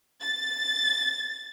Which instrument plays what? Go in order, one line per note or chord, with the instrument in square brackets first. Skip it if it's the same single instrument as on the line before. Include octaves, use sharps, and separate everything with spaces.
[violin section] A6